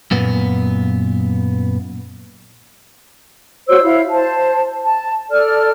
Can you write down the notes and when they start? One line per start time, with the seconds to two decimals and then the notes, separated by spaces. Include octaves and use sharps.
0.11 F#2 A#2 B3
3.68 F#4 C5 C#5 E6
3.83 E4 F5
4.10 C5 A5
4.85 A5
5.31 A4 D5 F6